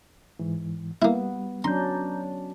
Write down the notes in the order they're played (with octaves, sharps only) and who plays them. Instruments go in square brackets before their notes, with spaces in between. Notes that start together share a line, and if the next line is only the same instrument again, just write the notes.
[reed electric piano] G#2 E3
[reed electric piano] G3 [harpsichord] A#3 E4 [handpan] B3
[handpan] F#3 C#4 D4 [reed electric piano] A#5 G6 [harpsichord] C6